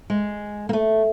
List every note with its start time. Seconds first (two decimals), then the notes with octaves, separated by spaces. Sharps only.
0.10 G#3
0.69 A#3
0.73 A3